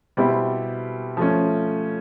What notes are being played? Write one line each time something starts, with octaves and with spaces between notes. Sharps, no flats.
B2 G3 C4 E4 G4
F3 A3 C#4